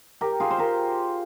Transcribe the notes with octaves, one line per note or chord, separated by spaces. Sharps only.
G4 A#4
F4 G#4
C5
G4 A#4